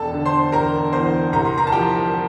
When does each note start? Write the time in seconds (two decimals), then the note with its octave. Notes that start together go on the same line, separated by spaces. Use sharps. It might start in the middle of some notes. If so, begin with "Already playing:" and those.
Already playing: E1 A4 A5
0.13 D3
0.26 C5 C6
0.52 E1 A#4 A#5
0.93 E2 C5 C6
1.33 C2 A#5
1.45 C6
1.58 A#4 A#5
1.67 A5
1.72 F3 G4 G5